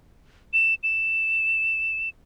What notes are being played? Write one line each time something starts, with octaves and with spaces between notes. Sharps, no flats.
E7
E7